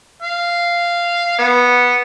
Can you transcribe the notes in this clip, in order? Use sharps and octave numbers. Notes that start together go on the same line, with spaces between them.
F5
B3